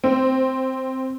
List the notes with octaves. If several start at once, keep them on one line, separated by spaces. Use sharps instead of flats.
C4